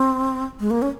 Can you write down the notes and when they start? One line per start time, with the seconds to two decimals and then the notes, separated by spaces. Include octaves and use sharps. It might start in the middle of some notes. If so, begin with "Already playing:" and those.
Already playing: C4
0.60 G#3
0.71 A#3
0.82 C#4